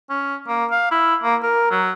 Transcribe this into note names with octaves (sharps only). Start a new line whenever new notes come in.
C#4
A#3
F5
E4
A#3
A#4
F#3